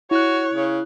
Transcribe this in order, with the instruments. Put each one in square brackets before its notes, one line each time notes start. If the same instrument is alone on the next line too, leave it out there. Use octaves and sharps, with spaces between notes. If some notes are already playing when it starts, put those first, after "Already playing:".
[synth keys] E4 F#6 [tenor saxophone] F#4 [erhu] C#5
[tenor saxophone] C#3